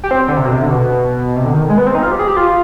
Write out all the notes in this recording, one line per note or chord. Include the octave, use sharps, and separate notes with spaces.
G4
C4
D3
C3
B2
C3
D3
B2
C3
D3
D#3
G#3
B3
C4
D#4
F4
G4
G#4
G4
F4